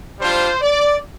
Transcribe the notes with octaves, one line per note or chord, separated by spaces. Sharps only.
G3 D4 F4 C5
D5